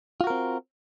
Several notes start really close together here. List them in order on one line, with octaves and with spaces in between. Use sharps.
F4 F#4 A#4 C4